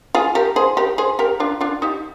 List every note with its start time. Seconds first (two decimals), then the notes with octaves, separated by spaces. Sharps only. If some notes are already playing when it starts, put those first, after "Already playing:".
0.15 F4 G#4
0.35 G4 A#4
0.56 G#4 C5
0.77 G4 A#4
0.98 G#4 C5
1.19 G4 A#4
1.40 D4 F4
1.61 D4 F4
1.82 D#4 G4